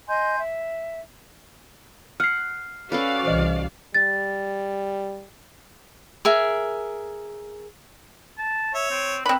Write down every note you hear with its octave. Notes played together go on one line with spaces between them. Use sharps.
D#5 G#5 C6 G6
E5
F#5 F6 C7
C#4 F#4 A4 B4 D5 F5
C2 C#3 E3 C5 D#5
G3 A6
G#4 A#4 E5
A5
C#5 E5
C4
C4 B4 B5